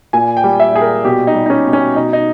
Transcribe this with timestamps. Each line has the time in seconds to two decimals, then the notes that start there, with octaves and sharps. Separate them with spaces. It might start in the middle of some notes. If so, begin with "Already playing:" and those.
0.13 A#2 G#5
0.37 G5
0.44 G3
0.60 E5
0.74 A#2 G#4
0.81 A#4
1.05 B2 G4
1.27 D#4
1.35 G3
1.46 D#4
1.50 C#4
1.66 B2
1.73 C#4
1.95 B2 D#4
2.13 D#4